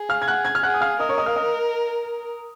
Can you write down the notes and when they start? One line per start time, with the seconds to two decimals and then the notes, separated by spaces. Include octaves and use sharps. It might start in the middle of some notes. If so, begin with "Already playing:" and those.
Already playing: G#4
0.09 F5 F6
0.22 G#6
0.28 F#5 F#6
0.45 G#5 G#6
0.55 F6
0.63 G#4 F#5 F#6
0.74 D#6
0.81 F5 F6
1.00 A#4 D#5 D#6
1.09 C#5 C#6
1.17 D#5 D#6
1.26 F5 F6
1.36 D#5 D#6